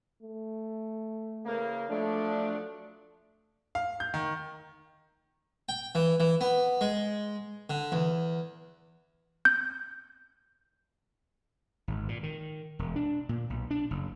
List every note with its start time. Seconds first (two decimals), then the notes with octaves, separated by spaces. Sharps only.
0.22 A3
1.46 C#3 E3 A#3
1.90 F3 F#3 A3 D4
3.75 F5
4.00 G6
4.14 D#3
5.69 G5
5.95 E3
6.20 E3
6.41 B3
6.81 G#3
7.70 D3
7.92 E2
9.45 G6
11.88 G#1
12.08 A#2
12.23 D#3
12.79 E1
12.96 D4
13.29 A#2
13.50 B1
13.71 D4
13.91 F#1